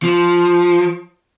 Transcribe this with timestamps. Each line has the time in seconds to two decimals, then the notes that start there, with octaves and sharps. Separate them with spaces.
0.03 F3